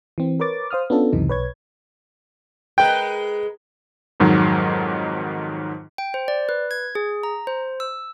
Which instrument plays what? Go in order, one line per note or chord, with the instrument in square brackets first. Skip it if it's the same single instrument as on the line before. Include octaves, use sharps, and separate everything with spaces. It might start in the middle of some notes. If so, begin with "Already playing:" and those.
[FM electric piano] E3 C4
A#4 B4 C#5 D6 A6
C5 F5 D#6 F6
B3 C#4 D4 F4 A4
C#2 F#2 C3 E3 D#4
B1 B4 C#5 G#6
[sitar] G#3 A#4 B4 [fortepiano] G5
[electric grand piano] F2 G#2 D#3 F#3
[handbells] G5
C5
D5
B4
G#6
G#4
A#5
C5
E6